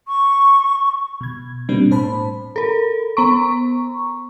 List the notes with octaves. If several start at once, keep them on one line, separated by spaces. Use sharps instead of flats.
C#6
B2 G#6
B2 G3 A#3 C4 D4
A2 C5 A5 B5
A4 A#4
B3 A#5 C#6